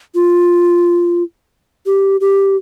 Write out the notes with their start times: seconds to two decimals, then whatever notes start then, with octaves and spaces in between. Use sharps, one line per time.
0.15 F4
1.86 G4
2.21 G4